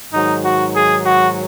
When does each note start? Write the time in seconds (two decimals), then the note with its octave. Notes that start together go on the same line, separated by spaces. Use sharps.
0.12 G#2 D#3 F#3 D#4
0.43 F#4
0.75 G#4
1.06 F#4